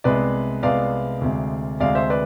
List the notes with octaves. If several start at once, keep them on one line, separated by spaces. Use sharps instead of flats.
C2 C3 G#3 B3 B4 D5
C2 C3 G#3 B3 D5 F5
D2 C3 G#3
D2 C3 G#3 D5 F5
C5 E5
B4 D5